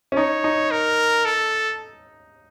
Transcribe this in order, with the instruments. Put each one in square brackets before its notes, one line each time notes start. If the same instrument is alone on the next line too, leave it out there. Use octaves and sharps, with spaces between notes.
[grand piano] C#4
[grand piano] D#4 [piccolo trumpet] C#5
[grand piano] D#4
[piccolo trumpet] A#4
A4